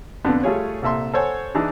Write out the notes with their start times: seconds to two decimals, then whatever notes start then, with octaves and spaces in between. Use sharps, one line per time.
0.25 F2 D3 B3 D4
0.43 G3 A3 F4 G#4 C#5
0.82 C2 A#2 A4 E5 C6
1.14 A4 C5 C#5 F#5 G#5
1.54 E3 D4 D#4 G#4